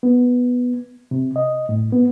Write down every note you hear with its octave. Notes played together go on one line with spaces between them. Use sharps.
B3
C3
D#5
A2
B3